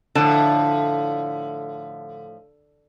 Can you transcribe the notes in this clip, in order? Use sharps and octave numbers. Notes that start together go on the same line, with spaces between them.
A2 D3 F3 A5